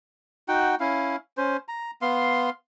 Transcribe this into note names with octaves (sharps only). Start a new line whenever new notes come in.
D#4 F#4 F#5 G5
C#4 E4 F5
C#4 C5
A#5
B3 F5 C6